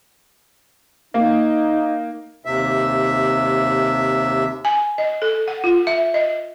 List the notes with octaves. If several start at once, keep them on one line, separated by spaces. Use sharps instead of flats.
A#3 D#4
D#2 C3 E5
G#5
D#5
A4
F#5
F4
E5
D#5